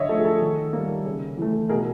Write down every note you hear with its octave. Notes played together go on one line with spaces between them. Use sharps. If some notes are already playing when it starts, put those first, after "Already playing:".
Already playing: D3 C#5 D#5 E5
F3 A3 A4
G#4
A4
D#3
G3 A#3
C#3
E3 A3
B2 G#4 A#4